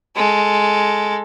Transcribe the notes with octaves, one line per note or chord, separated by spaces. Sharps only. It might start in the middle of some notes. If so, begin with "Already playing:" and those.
G#3 A4